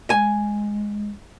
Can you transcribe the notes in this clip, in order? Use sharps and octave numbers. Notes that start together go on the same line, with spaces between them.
G#3 G#5